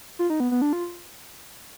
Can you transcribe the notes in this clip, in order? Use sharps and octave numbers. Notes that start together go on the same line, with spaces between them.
F4
D#4
B3
B3
D4
F4